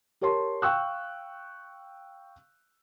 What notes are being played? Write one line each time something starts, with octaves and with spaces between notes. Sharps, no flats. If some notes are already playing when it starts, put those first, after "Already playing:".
G4 A#4 C#5 A5 C6
F5 G5 C#6 E6 F#6